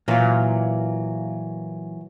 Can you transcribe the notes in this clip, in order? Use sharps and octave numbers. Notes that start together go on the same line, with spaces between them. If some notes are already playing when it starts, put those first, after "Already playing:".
A#2 E3 F#3 A#3 F4